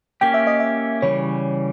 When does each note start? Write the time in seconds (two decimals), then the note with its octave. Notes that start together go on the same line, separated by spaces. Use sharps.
0.21 A#3 C#4 G4 G5
0.34 E5
0.47 D#5
0.60 E5
1.02 C#3 E3 G3 C#5